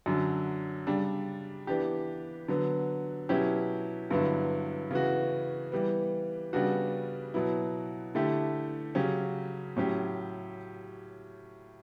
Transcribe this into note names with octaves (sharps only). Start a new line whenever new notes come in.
F#2 D3 F#3
C#3 G3 D4
E3 B3 D4 G4
D3 F#3 B3
B2 F#3 C#4 E4 G4
G2 D3 F#3 B3 E4
C#3 E3 B3 F#4
E3 G3 B3
C#3 G3 B3 D4 F#4
B2 F#3 B3 E4
D3 A3 E4 G4
C#3 F#3 C#4 G4
A2 F#3 C#4 G4